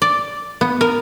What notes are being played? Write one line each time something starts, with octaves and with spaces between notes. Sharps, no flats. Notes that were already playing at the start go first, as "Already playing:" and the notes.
D5
B3
A#4